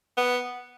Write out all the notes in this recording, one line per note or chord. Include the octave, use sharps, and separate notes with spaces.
B3